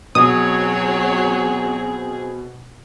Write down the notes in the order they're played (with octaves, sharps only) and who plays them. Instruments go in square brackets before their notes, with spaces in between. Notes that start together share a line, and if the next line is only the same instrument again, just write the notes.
[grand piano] B2 [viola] F#3 C#5 [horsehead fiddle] C4 G#4 [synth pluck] D#6